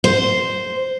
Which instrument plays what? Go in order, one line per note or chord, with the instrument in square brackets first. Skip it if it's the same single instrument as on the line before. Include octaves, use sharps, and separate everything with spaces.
[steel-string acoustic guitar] C5